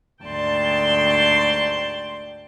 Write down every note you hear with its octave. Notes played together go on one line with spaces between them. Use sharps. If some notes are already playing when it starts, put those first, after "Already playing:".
D2 G#2 D5 G5 A5 C6